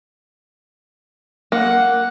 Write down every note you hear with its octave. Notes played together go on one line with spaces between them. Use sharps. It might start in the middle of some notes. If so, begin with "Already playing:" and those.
A#3 F#5